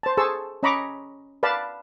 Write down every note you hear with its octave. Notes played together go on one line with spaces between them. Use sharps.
C5 A5
G#4 A4 C5 A5 C#6 E6
C#4 D#5 A#5 B5 C#6 D6
B4 D5 F5 A5 B5